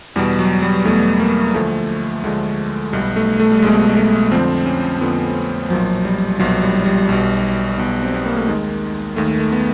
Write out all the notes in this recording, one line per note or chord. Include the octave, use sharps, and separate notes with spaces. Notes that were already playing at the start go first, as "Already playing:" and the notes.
E2 B2 G3
F#3
G3
E2 B2 A3
A#3
D2 D3 F3 A3
D2 D3 F3 G#3
B1 B2 G3
A3
A3
G3
B1 B2 G#3
A3
F2 D3 F3 C4
C#4
F2 D3 F3 B3
B1 A#2 F3 F#3
G3
B1 A#2 F3 F#3
G3
G3
B1 B2
B1 B2
C4
B3
A#3
A3
D#2 D#3 G#3
D#2 D#3 A3
A3
B3